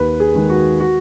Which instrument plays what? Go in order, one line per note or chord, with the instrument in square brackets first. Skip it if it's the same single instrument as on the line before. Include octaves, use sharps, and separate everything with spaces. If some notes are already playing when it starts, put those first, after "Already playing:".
Already playing: [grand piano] D#2 B4
G#4
D#3 G#3
F#4
F#4